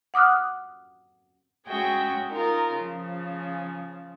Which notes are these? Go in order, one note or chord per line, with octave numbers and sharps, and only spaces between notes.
F#5 D6 D#6 F6 F#6
G#3 C#4 F#4 G#4 E5 G5
D#4 F4 A#4
C#3 F3